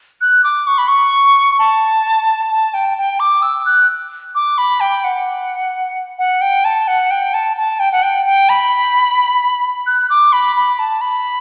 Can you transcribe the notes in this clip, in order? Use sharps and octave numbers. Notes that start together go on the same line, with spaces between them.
F#6
D6
C#6
B5
C#6
A5
A5
G5
G5
D6
E6
F#6
D6
B5
G5
F#5
F#5
G5
A5
F#5
G5
A5
A5
G5
F#5
G5
G5
B5
F#6
D6
B5
B5
A5
B5